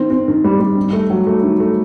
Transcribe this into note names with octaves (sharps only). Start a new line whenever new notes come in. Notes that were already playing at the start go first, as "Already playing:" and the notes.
Already playing: D#3 C4
C4
D#3
G3
G3
D#3
A3
F#3
A3
D#3
A3